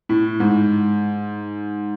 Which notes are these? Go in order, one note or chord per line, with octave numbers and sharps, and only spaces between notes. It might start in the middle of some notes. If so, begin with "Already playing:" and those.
A2
G#2